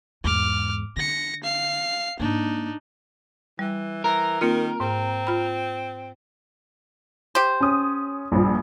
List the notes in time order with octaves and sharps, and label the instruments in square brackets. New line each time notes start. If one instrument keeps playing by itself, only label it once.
[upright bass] E2 G#2 [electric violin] D6 F6
[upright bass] D3 [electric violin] A#6 C#7
[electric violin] F5 C7
[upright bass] G#2 A#3 [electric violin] D4 D#4
[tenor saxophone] E3 [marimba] G3
[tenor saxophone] E3 [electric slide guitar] A#4
[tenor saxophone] D#3 [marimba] A#3 C4 F4
[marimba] G#2 [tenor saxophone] C4
[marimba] F4 B5
[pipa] G4 C5
[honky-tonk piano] C#4 D#6
A#1 G2 F3